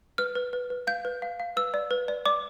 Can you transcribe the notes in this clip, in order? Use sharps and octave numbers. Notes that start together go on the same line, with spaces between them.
B4 F6
B4
B4
B4
F5 G6
B4
F5
F5
B4 E6
D5
B4
D5
D5 D6